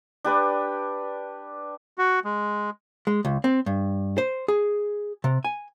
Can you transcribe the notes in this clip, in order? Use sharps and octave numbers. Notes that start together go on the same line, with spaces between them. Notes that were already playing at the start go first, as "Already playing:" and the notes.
D4 G4 B4 D5
F#4
G#3
G#3
C#2
C4
G2
C5
G#4
C3
G#5